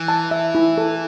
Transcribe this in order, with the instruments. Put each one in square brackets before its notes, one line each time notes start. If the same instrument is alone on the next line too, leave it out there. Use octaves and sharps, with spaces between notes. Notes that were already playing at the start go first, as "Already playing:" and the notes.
Already playing: [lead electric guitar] E3
[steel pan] A5
E5
E4
A4